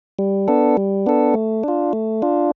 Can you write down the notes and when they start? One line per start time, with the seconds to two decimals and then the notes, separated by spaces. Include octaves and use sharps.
0.19 G3
0.48 B3 D4 A4
0.77 G3
1.06 B3 D4 A4
1.34 A3
1.64 D4 F4
1.93 A3
2.22 D4 F4